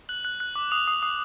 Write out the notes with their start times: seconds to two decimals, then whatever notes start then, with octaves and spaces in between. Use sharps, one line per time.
0.09 F#6 F#7
0.25 F#6
0.40 F#6
0.56 D6
0.71 D#6 F7
0.88 D#6
1.03 D#6